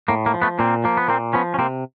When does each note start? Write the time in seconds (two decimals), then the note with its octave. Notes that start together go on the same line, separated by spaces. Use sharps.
0.08 A2 A#3
0.26 A#3
0.34 F3
0.42 A3 B3
0.59 A#2 A#3 C4
0.84 F3 A#3
0.97 B3
1.08 A#2 A#3 C4
1.33 F3 B3 C#4
1.54 C#4
1.58 C3 A#3 C4